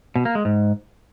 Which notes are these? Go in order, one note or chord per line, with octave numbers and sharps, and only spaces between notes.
B2
A#3
G#3
G#2